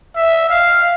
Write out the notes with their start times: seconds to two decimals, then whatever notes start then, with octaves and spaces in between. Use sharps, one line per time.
0.16 E5
0.50 F5